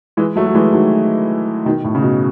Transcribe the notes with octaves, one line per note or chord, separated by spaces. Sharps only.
E3 G#3
F#3 A3
F#3
E3 G#3
D#3 F#3
B2 D#3
A2
C#3
B2